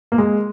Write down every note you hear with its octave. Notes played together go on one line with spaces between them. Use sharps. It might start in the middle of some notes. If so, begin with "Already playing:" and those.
A#3
G#3